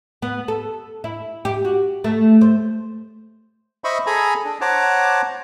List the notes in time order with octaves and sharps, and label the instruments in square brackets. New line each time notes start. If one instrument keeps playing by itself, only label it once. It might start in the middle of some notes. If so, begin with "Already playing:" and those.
[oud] B3
A4
E4
G4
F#4
A3
C5
[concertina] C5 D#5 E5 B5 C#6
G#4 A4 G#5 A#5 B5
D4
C5 C#5 F#5 A5 A#5 D6